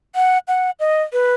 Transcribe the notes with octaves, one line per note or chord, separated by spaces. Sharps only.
F#5
F#5
D#5
B4